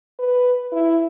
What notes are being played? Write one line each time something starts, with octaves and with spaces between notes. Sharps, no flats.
B4
E4